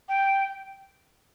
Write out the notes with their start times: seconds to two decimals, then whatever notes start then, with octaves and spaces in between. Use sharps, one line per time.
0.09 G5